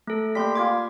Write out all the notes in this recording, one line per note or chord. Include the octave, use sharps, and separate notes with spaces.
A3 A4
G3 A#3 G5 C6 B6
F4 G#5 C6 D6